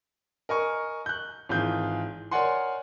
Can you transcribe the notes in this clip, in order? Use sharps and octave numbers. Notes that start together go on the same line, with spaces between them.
A#4 D#5 G#5 C#6
F#6 G6
G#1 E3 F4 G#4 G6
A#4 C#5 D5 F#5 G#5 C6